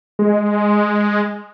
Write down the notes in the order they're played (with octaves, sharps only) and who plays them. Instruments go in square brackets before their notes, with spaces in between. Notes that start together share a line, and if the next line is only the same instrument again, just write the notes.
[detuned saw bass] G#3